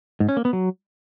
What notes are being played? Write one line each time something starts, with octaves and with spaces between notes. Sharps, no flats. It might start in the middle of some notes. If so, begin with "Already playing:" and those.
G#2
C#4
A#3
B3
F#3